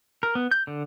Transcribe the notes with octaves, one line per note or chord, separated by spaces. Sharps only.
A#4
B3
G6
D3